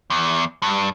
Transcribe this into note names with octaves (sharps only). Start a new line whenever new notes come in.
E2
G2